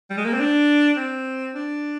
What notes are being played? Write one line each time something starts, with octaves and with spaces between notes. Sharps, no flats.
G3
G#3
A#3
C4
D4
C4
D4